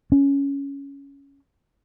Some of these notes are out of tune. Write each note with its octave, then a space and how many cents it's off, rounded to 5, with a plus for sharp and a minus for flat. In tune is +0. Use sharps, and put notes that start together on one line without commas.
C#4 +10